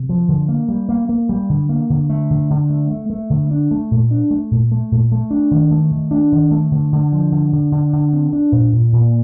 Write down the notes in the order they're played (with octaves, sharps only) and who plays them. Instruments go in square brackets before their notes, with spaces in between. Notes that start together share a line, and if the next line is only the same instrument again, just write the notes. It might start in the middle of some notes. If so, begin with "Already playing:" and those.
Already playing: [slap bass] C3
F3
D3
A#3
G3
A#3
A#3
G3
D3
A#3
D3
A3
D3
D3
A3
A3
A3
D3
D4
A3
A#2
D4
A3
A#2
A3
A#2
A3
D4
D#3
A3
D#3
D4
D#3
A3
D3
D3
F3
D3
D3
D3
D3
C4
D4
A#2
A#2
A#2